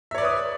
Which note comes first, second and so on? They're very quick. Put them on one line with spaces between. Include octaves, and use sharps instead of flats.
E5 C#5 D5 B4 D#6